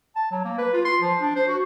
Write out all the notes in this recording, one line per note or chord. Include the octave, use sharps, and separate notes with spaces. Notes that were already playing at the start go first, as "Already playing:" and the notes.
A5
F#3
A#3
B4
F4
C6
F3
D4
C5
F#4